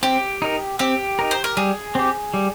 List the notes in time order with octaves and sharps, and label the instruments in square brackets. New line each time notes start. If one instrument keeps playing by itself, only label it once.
[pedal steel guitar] C4 [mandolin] G4
[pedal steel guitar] D#4 A#4
[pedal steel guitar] C4 [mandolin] G4
[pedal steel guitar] D#4 A#4
[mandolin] C5
A#4
[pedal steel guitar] G3 [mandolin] G#4
[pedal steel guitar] C4 G4
G3